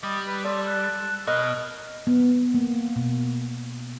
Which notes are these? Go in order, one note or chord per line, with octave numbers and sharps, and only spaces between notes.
G3 D#5 B5
B4
A4 D5 C6
F#6
B2 A#4 D#5 F#6
B3
A#3
B2